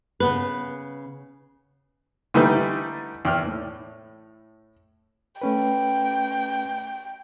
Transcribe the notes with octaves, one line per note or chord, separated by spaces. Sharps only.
C#3 B3 B4
D3 E3 G3 A3 D#4 B4
E2 G5 F6
A2
A3 C#4 B4 G5